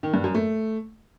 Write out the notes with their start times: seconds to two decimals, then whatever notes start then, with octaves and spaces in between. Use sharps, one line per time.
0.03 D#3
0.14 G2
0.24 F#2
0.35 A3